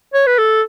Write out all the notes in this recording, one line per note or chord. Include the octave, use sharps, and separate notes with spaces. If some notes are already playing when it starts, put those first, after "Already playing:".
C#5
B4
A4